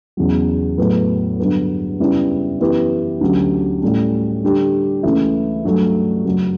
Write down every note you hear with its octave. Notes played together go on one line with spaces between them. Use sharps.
E2 C#3 F#3
A2 F#3 B3
G2 D3 F#3 B3
F#2 C#3 G3 B3 E4
F#2 E3 B3 E4 G4
D2 D3 F#3 C#4 G4
A2 G3 C#4
D3 G3 D4 G4
C#2 C#3 E3 A3 E4
G2 F#3 A3
F#2 C#3 F#3